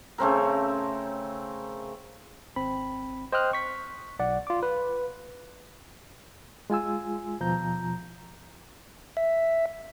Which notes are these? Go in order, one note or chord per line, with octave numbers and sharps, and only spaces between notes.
C#3 A3 C4 A#4
G#1 C4 B5
C5 D#5 G5 D#6 F6 F#6
C#6 B6
B1 D5 F#5
F4 D6
B4
G#3 F4 G#5 E6
D#2 B2 F3 A#5 G6
E5